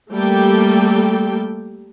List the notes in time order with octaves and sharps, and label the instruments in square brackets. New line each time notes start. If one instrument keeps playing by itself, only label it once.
[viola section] G3 A3 A#3 G4 A4 G5